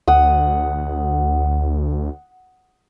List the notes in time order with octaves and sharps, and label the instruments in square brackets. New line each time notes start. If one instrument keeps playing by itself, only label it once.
[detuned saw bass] D2 [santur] F#5 D#6